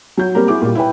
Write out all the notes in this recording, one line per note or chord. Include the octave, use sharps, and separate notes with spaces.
F#3 G6
G3 A#3 C4 G4 A#4
E4 F#4 G#4 D6
A#2 G3
E4 B4 G5